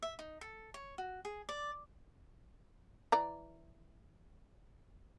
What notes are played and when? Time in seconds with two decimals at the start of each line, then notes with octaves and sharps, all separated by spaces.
0.03 E5
0.19 D#4
0.41 A4
0.74 C#5
0.98 F#4
1.25 G#4
1.49 D5
3.12 E3 D5 A#5